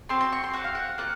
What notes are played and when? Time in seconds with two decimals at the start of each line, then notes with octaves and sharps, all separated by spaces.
0.09 C4 F#4 C6
0.21 C6
0.32 C#6
0.44 C6
0.53 C4 F#4 F#5
0.64 F5
0.75 F#5
0.98 A#3 F4 F#5